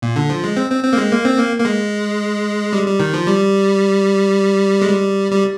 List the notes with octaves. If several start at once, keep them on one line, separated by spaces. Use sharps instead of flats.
A#2
D3
F3
G#3
C4
C4
C4
A#3
G#3
A#3
C4
A#3
A#3
G#3
G3
G3
D#3
F3
G3
G#3
G3
G3